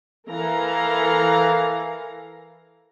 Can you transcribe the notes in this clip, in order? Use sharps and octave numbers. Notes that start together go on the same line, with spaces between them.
E3 A4 A#4 F5 A#5